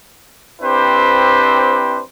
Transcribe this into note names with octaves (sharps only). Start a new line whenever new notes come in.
C4 D4 E4 G4 B4 C5